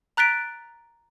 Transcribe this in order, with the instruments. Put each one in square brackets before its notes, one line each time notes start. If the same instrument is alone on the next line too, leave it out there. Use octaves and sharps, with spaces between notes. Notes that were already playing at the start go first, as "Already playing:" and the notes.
[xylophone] A#5 F#6 A6 B6 D7